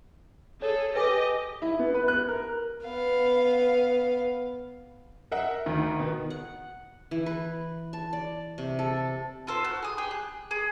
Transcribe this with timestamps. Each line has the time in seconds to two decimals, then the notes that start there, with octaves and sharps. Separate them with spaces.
0.62 G#4 A4 C#5
0.96 G4 B4 D#5 G#5 D6
1.62 E4
1.79 B3
1.94 B4
2.08 F#6
2.28 A#4
2.85 B3 F5
5.31 A#4 E5 F#5
5.66 D2 D#3
5.99 B2
6.30 F#5
7.11 E3
7.26 B4
7.93 A5
8.13 D5
8.58 C3
8.79 A4
9.47 F4 A4 C5
9.64 F#4
9.83 G#4 D#6
9.98 G4 G#4 G5
10.11 F#6
10.51 G#4